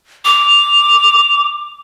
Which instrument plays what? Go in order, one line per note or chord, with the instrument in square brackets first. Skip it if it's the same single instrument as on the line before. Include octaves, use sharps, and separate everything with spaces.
[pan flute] D6 [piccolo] F7